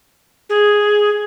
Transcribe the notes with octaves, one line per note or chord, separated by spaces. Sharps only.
G#4